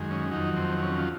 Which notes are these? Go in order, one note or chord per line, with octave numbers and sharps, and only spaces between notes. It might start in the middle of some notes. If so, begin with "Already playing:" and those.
Already playing: F#2 D#3 G#3
C#4
F2 D#3 F#3 D#4
C4
C#4
F4